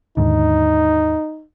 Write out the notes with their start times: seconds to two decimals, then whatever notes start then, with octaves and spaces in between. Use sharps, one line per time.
0.17 D#2 G#2 D3 D#4